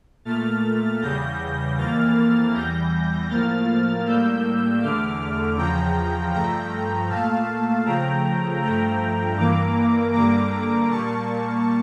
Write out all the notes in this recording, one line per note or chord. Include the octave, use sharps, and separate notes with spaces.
A#2 A3 F6 A6
E2 C#3 G3 G6 A#6
F2 E3 A#3 F6 A6
E2 E3 G3 G6 A#6
A2 F3 A#3 F6 A6
A2 G3 A#3 E6 G6
E2 D3 A3 D6 F6
E2 C#3 F3 G5 A#5
G2 F3 A3 G5 A#5
A#2 A3 F5 A5
C#3 F3 A3 G5 A#5
G2 F3 A3 G5 A#5
G2 E3 A#3 A#5 D6
G2 D3 G3 A#3 A#5 D6
A#2 G3 A#3 A5 C#6